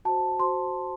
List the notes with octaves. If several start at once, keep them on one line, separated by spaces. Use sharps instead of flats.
F#4 C5 A5
F#4 C5 C6